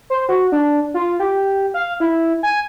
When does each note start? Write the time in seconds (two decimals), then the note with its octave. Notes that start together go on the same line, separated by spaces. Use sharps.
0.10 C5
0.29 F#4
0.52 D4
0.94 F4
1.20 G4
1.74 F5
2.00 E4
2.43 G#5